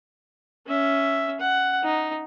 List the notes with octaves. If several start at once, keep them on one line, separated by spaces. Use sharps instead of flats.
C#4 E5
F#5
D#4